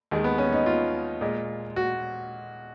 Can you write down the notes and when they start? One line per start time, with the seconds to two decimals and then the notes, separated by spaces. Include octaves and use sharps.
0.11 D#2 D#3 G#3
0.24 B3
0.38 C#4
0.52 D#4
0.66 F4
1.21 A#2 G#3
1.76 F#4